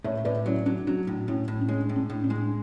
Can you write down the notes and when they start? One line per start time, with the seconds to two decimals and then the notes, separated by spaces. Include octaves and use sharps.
0.04 A2 C#5 E5
0.18 E5
0.25 A2 B4 D5
0.46 F#3 C#4 E4
0.66 F#3 D4
0.87 F#3 D4 F#4
1.07 A2
1.28 A2 C#4 E4
1.48 A2
1.61 D4
1.68 G#3 C#4
1.89 A2
1.96 D4
2.10 A2
2.24 D4
2.30 G#3